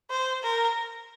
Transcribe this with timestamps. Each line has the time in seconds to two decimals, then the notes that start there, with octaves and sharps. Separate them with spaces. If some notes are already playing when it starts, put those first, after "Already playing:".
0.11 C5
0.43 A#4